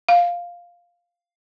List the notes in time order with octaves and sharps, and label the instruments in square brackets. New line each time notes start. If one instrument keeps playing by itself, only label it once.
[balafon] F5